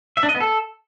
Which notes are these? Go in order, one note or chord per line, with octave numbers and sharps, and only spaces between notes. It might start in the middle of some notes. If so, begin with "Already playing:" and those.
E5
D4
D#5
B3
A4